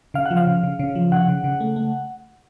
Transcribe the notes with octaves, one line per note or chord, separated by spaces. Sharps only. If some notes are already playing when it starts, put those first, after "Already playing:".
C#3 F5
F#5
F3
F5
C#3
C#3
C#3
F3
C#3 F#5
C#3
C#3
A3
A3